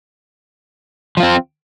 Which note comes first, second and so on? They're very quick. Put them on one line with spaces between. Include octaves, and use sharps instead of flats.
F3 F4 C4